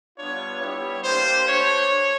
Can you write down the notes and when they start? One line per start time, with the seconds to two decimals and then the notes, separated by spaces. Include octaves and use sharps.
0.19 G3 B3 D4 F4 C#5
0.61 G3 B3 E4 G4 C#5
1.04 A#3 D4 G4 C5
1.46 A3 D4 G4 C#5